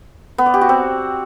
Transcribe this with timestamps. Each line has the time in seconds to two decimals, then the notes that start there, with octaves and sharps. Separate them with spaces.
0.38 B3
0.46 D5
0.54 G4
0.61 F#4
0.69 C4